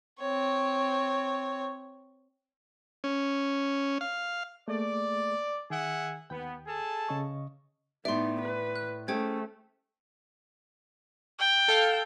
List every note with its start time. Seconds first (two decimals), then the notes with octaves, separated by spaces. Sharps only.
0.19 C4 C#5
3.04 C#4
4.01 F5
4.68 A3 A#3 G#4 D5
5.70 D#3 G#4 E5 F#5
6.30 D#2 B3 G5
6.66 G#4 A4 A5
7.09 C#3 D#5 C#6
8.05 A2 B3 D#4 D5 E5 C6
8.42 B4
8.76 F#6
9.08 A3 C#4 G#4 C5 G5 G#6
11.40 G5
11.68 A4 F5